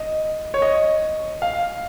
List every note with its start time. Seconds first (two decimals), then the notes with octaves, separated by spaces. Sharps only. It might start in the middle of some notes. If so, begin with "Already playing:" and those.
Already playing: D#5
0.54 C#5
0.62 D#5
1.42 F5